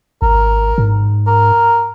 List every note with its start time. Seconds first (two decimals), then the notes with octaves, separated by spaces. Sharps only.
0.22 G#1 A#4
0.78 G#2
1.27 A#4